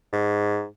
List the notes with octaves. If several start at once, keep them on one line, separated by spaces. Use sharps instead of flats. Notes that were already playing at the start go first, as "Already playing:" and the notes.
G#2